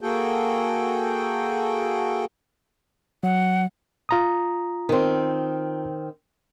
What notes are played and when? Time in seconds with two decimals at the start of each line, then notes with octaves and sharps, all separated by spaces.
0.01 A#3 F#4 G#4 A4 G5
3.23 F#3 F#5
4.09 F4 A#5 D#6
4.89 D#3 C4